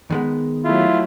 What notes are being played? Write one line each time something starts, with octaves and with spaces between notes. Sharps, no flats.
D#3 G#3 B3
F#3 A3 E4 F4